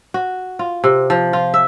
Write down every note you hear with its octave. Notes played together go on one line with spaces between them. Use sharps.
F#4
F4
C3
F3
F4
E5